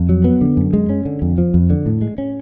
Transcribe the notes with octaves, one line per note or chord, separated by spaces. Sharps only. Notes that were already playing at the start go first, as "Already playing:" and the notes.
Already playing: F2
F#3
B3
D3
F#2
G#3
C#4
D3
F2
F3
F2
D3
A2
G#3
C#4